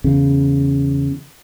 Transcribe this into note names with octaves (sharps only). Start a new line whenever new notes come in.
E2 C#3